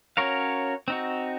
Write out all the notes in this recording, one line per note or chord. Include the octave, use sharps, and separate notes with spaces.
C#4 F#4 A#4 C#5 F5
C4 D#4 F#4